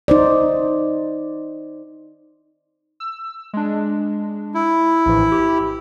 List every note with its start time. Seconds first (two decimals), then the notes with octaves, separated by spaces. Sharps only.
0.08 D#4 C5 D5
3.00 E6
3.53 G#3 D4
4.55 E4
5.06 A#1 A2 E3
5.32 G4